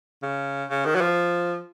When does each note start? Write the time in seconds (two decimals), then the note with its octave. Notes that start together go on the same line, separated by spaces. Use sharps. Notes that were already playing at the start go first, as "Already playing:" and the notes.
0.22 C#3
0.70 C#3
0.85 D#3
0.95 F#3
1.01 F3